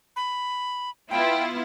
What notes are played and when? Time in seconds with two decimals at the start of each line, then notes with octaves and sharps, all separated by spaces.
0.16 B5
1.11 B3 E4 F4 G5